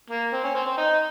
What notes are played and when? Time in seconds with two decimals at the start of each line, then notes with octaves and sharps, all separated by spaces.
0.10 A#3
0.33 C4
0.44 C#4
0.55 C4
0.66 C4
0.78 D#4